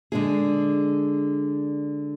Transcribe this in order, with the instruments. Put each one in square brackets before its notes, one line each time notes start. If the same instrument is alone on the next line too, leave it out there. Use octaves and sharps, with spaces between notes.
[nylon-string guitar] D3 G#3 D4 G#4